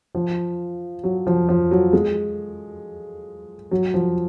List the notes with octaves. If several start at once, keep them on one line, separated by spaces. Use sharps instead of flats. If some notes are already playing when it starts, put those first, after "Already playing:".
F3
F#3
F3
F3
F#3
G#3
F#3
F3